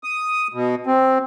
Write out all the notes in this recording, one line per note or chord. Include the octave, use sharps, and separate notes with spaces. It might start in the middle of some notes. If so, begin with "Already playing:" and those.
D#6
B2
C4